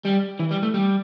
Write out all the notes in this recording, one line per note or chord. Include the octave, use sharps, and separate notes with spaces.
G3
E3
G3
A3
G3